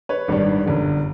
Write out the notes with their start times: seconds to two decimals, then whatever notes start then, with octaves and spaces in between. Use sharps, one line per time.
0.09 B4 C#5
0.28 G#1 G2 D#3 G3
0.66 G1 F#2 D3 G3